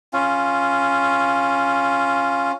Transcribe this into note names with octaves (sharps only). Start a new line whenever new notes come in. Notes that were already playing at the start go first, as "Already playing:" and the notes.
C#4 F4